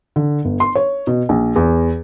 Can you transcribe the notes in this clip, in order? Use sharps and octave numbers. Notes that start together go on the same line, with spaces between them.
D3
G1
C6
C#5
B2
A#1
E2